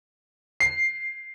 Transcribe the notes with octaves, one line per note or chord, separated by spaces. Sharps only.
C7